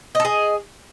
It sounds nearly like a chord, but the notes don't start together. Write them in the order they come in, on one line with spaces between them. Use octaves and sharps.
D#5 A4 G#4